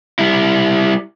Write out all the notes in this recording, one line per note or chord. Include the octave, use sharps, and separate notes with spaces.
G3 E4